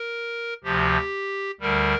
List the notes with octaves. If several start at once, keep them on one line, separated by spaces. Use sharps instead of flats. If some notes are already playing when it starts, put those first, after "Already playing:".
Already playing: A#4
D2 C3 F3 G4
D2 D3 G3 A#4